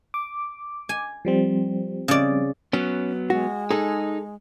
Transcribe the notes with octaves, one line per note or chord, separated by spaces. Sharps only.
D6
G#5
F3 G3 C4
C#3 D5
F#3 B3 C#4
G#3 F#4
D#4 G#4 A4